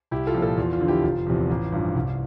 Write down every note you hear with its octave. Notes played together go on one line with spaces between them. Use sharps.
C2 E4 G4
F4 A4
A#2 F3
F4 A4
E2 F4
F4
D3 F3
E4 G4
F1 F4
E2 C3 F3
A1
G2 F3
C2